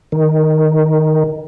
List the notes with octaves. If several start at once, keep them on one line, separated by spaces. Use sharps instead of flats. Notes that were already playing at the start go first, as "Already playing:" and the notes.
D#3